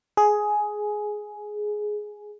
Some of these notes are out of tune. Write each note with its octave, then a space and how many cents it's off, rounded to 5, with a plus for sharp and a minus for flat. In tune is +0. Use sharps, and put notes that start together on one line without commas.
G#4 +10